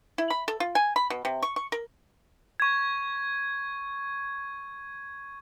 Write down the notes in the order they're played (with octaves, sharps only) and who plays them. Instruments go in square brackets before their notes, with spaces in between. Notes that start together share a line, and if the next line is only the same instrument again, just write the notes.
[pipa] E4
B5
A4
F4
G#5
B5
B2
C3
C#6
C#6
A#4
[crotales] C#6 G#6